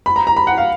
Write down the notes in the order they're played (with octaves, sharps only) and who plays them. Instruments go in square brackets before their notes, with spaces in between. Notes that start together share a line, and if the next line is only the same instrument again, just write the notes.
[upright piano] B5
A#5
A#5
B5
F#5
F5